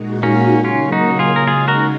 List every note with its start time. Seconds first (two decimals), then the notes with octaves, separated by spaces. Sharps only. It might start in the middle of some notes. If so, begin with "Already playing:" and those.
Already playing: A#2 G#3 D#4 F#4
0.23 A#3 C#4
0.64 C#3 F#3 A#3 C#4 F4
0.92 D#4 F#4
1.19 F4 G#4
1.36 A#4
1.47 C#3 G#3 D#4 F4 G#4
1.68 F#4 A#4